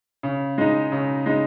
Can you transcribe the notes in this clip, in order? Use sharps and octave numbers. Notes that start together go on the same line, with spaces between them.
C#3
G#3 D#4
C#3
G#3 D#4